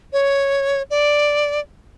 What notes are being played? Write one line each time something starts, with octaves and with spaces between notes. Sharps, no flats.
C#5
D5